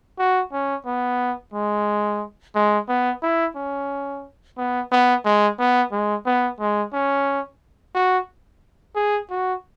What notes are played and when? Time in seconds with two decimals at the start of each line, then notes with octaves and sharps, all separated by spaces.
0.18 F#4
0.52 C#4
0.86 B3
1.54 G#3
2.55 G#3
2.88 B3
3.22 E4
3.56 C#4
4.57 B3
4.91 B3
5.25 G#3
5.59 B3
5.92 G#3
6.26 B3
6.60 G#3
6.93 C#4
7.95 F#4
8.96 G#4
9.30 F#4